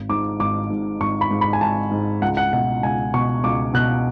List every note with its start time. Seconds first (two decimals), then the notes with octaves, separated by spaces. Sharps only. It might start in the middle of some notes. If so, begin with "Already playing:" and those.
Already playing: G#1
0.09 G#2 D6
0.40 G#1 D6
0.70 G#2
1.00 G#1 C#6
1.21 B5
1.31 G#2
1.41 B5
1.53 G#5
1.61 G#1 A5
1.92 G#2
2.22 C#2 F#5
2.37 F#5
2.53 B2 F#5
2.83 C#2 G#5
3.14 B2 C#6
3.44 C#2 D6
3.74 B2 F#6